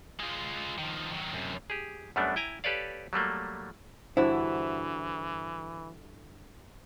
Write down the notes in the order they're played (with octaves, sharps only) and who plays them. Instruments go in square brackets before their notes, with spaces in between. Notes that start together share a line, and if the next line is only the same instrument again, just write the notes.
[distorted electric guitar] G#3 F4
D#3 F3
D#3 F#3
F#2 C3
[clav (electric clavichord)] G4 G#4
F#2 G3 A3 B3 D4
E4 G5 G#5 A#5
G4 A4 B4 C#5 D5 F5
F#3 G3 A3 A#3
[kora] G2 D3 F#4 [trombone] E3 [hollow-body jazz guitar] E4 [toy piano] C5